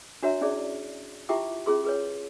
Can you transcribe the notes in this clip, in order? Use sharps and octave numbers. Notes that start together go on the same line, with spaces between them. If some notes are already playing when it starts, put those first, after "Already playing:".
D4 F#4 C#5 E5 A#5
C#4 E4 G#4 D5
E4 F4 G4 E5 G5 D6
C#4 F4 G#4 C6
G#4 B4 C#5